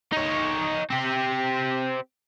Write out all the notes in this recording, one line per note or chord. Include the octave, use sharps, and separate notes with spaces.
D#4 C#5
C4 G4